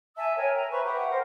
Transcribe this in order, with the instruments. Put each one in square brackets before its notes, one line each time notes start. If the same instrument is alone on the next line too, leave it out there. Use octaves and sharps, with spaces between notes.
[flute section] E5 G#5 A5 E6
A#4 C#5 G5 G#5
A#5
B4 C5 E5 C#6
G4 E5 F#5
A#4 C5